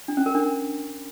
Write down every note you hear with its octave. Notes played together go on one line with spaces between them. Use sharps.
D4
C#4
A#4
D4